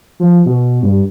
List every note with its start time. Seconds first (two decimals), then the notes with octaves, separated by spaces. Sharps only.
0.20 F3
0.46 B2
0.83 G2